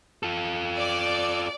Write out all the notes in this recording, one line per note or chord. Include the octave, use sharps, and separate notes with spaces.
F4 A4
D5